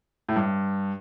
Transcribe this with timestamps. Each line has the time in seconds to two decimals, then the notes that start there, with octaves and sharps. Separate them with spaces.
0.29 A2
0.36 G2